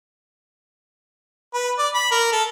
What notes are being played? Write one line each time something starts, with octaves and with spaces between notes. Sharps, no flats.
B4
D5
B5
A#4
A4